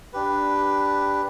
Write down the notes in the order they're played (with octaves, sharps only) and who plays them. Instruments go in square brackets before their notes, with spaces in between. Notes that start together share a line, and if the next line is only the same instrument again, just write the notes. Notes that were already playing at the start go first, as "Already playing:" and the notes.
[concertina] D4 G4 B4